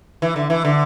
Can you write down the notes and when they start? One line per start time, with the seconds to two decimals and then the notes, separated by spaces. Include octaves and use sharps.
0.22 E3
0.36 D3
0.50 E3
0.65 D3